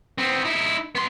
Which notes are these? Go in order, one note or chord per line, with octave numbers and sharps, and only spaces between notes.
B3 C4
D#4 E4
B3 C6